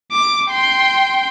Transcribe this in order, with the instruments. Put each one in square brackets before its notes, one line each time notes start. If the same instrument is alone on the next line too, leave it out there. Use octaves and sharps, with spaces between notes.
[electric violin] D6
G5 C6